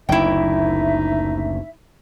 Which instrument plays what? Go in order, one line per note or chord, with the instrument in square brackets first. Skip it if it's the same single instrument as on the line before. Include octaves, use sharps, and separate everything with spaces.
[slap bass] F#1 D2 [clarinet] D#4 [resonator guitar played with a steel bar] E4 G5 [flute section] E5